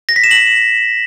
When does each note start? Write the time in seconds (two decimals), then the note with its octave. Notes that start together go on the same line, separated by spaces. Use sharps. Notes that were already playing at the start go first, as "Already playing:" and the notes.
0.09 A#6
0.16 B6
0.24 E7
0.31 F#7